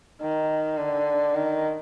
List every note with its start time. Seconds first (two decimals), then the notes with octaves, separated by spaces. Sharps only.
0.21 D#3
0.78 D3
1.35 D#3